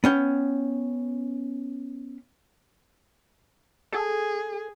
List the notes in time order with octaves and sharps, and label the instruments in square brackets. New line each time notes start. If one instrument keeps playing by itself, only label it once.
[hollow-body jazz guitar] B3 C#4 G5
[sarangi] G#4 [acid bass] A4